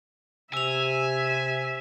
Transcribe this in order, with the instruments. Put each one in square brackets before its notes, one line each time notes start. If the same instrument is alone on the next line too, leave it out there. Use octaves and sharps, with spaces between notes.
[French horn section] C3 [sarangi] E5 [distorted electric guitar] G#5 [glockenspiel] E6 F7